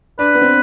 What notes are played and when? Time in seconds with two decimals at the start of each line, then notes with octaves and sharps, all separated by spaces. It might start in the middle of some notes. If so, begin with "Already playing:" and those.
0.19 D4 B4
0.35 B3
0.42 C4